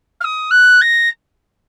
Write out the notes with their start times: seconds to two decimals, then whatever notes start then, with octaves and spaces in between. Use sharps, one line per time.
0.20 F6
0.24 D#6
0.51 F#6
0.81 A#6